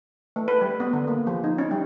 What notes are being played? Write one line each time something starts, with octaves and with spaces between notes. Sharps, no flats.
A3
B4
G3
B3
D3
A#3
F3
D#4
C#4
G3